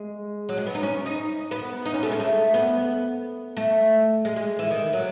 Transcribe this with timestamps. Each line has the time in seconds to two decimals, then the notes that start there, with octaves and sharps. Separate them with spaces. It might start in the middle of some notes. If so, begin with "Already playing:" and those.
Already playing: G#3
0.49 F#3
0.58 G#3
0.67 B3
0.75 D#4
0.83 C#4
1.06 D#4
1.51 B3
1.86 D#4
1.94 C#4
2.03 A3
2.12 G#3
2.20 A3
2.54 B3
3.57 A3
4.25 G#3
4.36 G#3
4.59 E3
4.71 D#3
4.93 F#3